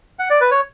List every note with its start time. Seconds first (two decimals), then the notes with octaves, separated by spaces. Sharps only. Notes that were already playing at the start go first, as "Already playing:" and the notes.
0.19 F#5
0.30 D5
0.41 B4
0.51 C#5